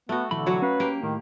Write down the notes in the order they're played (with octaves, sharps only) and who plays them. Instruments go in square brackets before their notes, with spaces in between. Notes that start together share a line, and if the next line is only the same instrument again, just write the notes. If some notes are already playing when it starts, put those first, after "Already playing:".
[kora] A3 F#4 [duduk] B3
[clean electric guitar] B1 E3 B5 [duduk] D3 [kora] A3
[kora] F#3 F#4 C#5
[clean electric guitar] C#4 F5 [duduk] B4
[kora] A#3 G4
[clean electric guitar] A2 [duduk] D#3